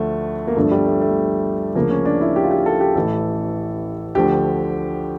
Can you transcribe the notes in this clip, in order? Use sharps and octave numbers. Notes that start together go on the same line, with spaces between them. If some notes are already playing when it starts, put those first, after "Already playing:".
Already playing: D2 D3 F3 A3
A#3
G1 G2 D3 F3 A3
G3
A3
A3
D2 C#3 F3 A#3
C#4
D4
E4
G4
F4
G4
A4
G4
A1 A2 E3 A4
D2 D3 F3 G4